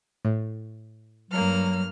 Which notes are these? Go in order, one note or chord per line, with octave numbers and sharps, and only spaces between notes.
A2
G2 F#3 A#3 F6